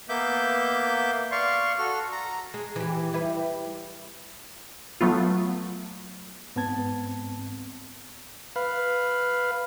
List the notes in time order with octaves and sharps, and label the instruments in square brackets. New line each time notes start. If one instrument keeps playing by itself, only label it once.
[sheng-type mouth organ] A#3 B3 E5 D6 G6
D5 F5 C6 C#6
F#4 A4 F6
A#5
[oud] G#3
E3 G4
G3 E4 B4
[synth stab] F#3 A3 B3 F4
[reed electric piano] G#2 B3 C4 A5 G#6
[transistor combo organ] B4 F5